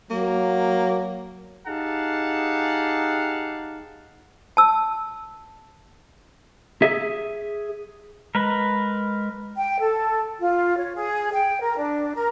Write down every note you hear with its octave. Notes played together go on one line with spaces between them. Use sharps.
F#3 A#3
D#4 G4 G#4 F5 F#5 A5
A5 E6
G#4 E5
G#3 A#4 B4
G5
A4
F4
C#5
G#4
G5
A#4
D4
A#4